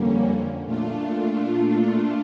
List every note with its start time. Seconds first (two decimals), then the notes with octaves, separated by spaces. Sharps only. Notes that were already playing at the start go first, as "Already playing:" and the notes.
Already playing: F2 D3 G3 A#3 C#4
0.65 A#2 A3 D4 F4